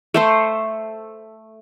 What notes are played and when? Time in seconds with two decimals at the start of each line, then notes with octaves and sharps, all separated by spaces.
0.14 A3 A4 C5